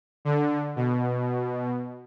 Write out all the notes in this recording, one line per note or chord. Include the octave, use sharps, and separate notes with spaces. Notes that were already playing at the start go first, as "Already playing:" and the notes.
D3
B2